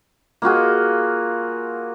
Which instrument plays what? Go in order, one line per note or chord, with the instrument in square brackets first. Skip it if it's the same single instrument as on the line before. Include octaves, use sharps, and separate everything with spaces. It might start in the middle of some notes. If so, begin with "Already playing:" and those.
[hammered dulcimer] A#3 F4 F#4 G#4